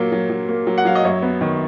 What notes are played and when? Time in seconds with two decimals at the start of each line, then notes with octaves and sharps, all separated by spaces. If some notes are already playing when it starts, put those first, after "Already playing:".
Already playing: A#2 F#3 A#3
0.12 F#3
0.30 F#3
0.49 A#3
0.67 F#3
0.78 F#5
0.85 F#3 F5
0.95 D#5
1.04 F#2 C#5
1.22 B3
1.41 D#3